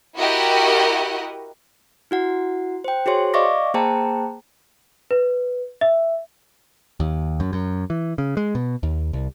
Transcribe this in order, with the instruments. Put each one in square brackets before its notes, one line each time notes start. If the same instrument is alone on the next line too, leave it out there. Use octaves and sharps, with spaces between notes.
[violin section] E4 F#4 G4 A#4 D#5 F#5
[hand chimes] E4 F#4 F#5
C5 G5
F#4 G#4 C5 C#5 C6
D5 D#5 F5 C#6 D6 A#6
A#3 G#4 C5 G5 A5 A#5
[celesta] B4
E5
[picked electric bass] D#2
F#2
F#2
E3
C#3
G#3
B2
D#2
C2